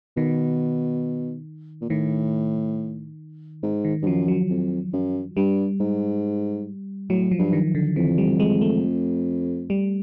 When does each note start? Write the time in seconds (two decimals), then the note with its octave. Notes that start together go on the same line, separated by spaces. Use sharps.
0.17 B2 D#3
1.81 A#2
1.90 A2 D#3
3.63 G#2
3.85 D#3
4.02 G2
4.07 F#2 F3
4.28 F#3
4.49 F2
4.93 F#2
5.37 G2 G3
5.80 G#2
7.10 A2 F#3
7.31 F3
7.39 G2
7.53 D#3
7.75 D3
7.96 F2 E3
8.18 G3
8.40 G#3
8.61 A3
9.70 G3